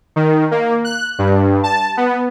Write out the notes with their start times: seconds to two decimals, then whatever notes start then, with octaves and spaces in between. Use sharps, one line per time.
0.16 D#3
0.51 A#3
0.85 F#6
1.19 G2
1.63 A5
1.97 B3